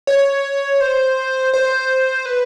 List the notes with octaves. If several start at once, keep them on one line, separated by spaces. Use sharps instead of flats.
C#5
C5
C5
B4